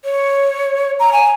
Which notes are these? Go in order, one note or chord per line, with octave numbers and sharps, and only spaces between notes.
C#5
A#5
G#5